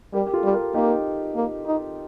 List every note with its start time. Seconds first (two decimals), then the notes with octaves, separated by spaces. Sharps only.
0.13 G3 G4 A#4
0.27 G4
0.33 F4 A4
0.44 G3
0.54 G4 A#4
0.74 A#3 D#4 G4
1.35 A#3
1.66 D#4